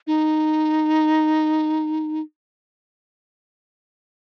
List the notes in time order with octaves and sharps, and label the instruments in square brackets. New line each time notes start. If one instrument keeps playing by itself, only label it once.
[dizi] D#4